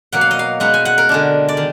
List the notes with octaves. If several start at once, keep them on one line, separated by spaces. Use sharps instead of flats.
B2 F#3 A#3 F#5
F5
D#5
F5
B2 G#3 D#4 F#5
G#5
F#5
A#4
D3 G#3 D4
D5
D#3